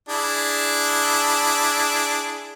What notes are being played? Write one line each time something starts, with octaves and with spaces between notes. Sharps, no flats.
D4 E4 G#4